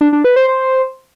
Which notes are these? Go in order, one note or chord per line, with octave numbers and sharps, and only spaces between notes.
D4
D4
B4
C5
C5